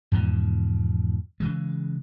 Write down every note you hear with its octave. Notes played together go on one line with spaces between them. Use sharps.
E2 G#2 B2 F3
C#3 E3 G#3